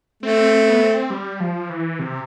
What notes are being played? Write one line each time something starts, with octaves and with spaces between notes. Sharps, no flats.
A3 C4
B3
C4
G3
F3
E3
C3